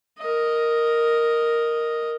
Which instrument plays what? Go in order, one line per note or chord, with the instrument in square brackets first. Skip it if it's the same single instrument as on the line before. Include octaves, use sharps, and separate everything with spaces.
[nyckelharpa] A#4 D#5